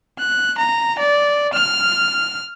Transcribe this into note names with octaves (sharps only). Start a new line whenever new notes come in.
F#6
A#5
D5
F6